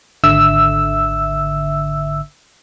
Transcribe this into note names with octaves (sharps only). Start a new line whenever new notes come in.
G#1 D3 E5 E6